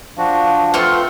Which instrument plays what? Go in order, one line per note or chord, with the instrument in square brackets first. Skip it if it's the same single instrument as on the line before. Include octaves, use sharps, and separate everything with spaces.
[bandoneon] F3 D4 [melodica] F#4 [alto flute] F5
[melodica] A3 C4 [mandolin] F4 C6 C#6 [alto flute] B4